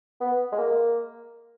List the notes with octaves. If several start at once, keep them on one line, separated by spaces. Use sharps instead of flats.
B3
G#3
A#3